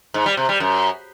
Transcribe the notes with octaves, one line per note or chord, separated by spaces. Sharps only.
G#2
G3
C3
G3
F#2